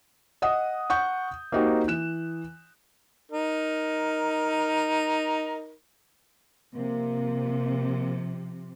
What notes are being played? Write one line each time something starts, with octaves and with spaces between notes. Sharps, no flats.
D#5 F#5 D#6
F#5 C#6 G6
A#3 C4 D#4 F#4 G4
E3 F#6 E7
D#4 A#4
C3 F3 A#3